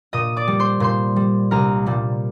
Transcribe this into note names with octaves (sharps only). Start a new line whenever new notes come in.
A#2 D#5 D#6
D5 D6
G3
C5 C6
A#2 C5 C6
G3
C2 A#4 A#5
A#2 G3